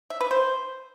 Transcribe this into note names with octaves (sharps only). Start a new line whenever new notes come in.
E5
B4
C5